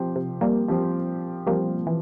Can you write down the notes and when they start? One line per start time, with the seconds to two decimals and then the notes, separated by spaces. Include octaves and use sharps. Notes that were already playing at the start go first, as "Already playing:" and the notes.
Already playing: F3 C4 G4 C5
0.16 C3
0.41 G3 A#3
0.68 F3 C4 G4 C5
1.47 F3 G3 A#3 C4 G4 C5
1.87 E3